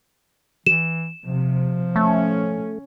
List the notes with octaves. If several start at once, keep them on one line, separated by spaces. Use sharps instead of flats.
E3 E7
C3 F3
A3 C#4